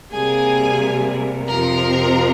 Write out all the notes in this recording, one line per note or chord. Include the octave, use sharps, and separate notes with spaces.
C3 G3 A#3 G#4 G#5
F2 C3 F3 C4 A#4 A#5